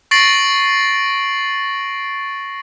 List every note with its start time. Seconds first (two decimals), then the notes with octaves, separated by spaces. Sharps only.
0.11 C#6 A6 A#6 C7 D7 F#7